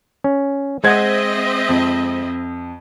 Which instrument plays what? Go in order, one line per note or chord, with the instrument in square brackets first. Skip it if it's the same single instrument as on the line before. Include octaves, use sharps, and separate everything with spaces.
[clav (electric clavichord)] C#4
[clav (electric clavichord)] G#3 [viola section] C4 D#5 E5 [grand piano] C5 F#5 G#6
[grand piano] F2